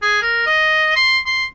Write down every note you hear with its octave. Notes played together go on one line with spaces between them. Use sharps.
G#4
A#4
D#5
C6
C6